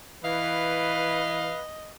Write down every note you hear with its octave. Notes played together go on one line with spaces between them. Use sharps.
E3 B4 D#5 F5